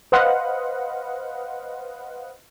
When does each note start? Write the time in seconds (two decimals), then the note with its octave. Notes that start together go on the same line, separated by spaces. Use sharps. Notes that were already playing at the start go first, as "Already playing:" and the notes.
0.12 B4 C5 D#5 F5 F#5